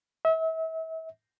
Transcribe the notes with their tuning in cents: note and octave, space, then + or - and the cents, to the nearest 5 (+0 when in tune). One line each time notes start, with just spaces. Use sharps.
E5 -35